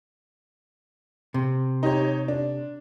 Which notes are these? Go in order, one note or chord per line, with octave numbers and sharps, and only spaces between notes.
C3
D#4 G4 C#5
D4